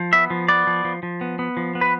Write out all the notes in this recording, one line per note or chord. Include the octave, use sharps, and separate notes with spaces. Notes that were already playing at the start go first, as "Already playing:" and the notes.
Already playing: F3
B3 E5
F3
B3 D5
F3
F3
F3
B3
B3
F3
B3
B4